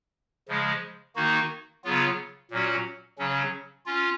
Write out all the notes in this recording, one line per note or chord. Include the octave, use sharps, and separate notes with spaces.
C#3 F3 G#3
D#3 A#3 D#4 F#4
C#3 F#3 B3 F4
A#2 F#3 C#4 F#4
C#3 F#3 C#4
C#4 F4